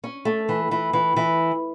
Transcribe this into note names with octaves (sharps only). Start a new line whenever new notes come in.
C#4
A3
E3
E3
E3
E3